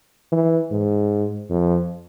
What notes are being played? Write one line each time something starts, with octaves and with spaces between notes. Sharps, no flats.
E3
G#2
F2